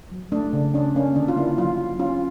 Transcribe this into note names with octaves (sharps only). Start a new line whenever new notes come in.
F#3
A3 D4
C#3
C#4 D4
A#3 C#4
D3 D4
F4
A#3 E4
F#3 F4
F#3
C#4 F4